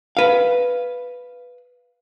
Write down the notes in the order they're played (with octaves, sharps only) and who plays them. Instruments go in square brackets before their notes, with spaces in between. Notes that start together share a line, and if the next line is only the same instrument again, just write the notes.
[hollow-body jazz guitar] B4 F5